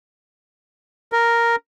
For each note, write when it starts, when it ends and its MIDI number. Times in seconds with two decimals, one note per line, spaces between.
1.12 1.56 70